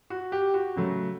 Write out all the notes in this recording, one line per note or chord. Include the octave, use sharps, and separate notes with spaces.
F#4
G4
F#4
C#3 F#3 A3